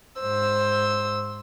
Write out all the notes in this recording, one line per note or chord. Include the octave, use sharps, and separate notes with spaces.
G#2 C5 E6